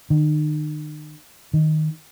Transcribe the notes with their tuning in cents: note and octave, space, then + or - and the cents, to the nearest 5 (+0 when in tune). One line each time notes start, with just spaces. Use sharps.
D#3 -40
D#3 +0